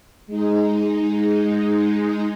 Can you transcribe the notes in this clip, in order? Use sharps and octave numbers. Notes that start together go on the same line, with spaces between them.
G#3 D#4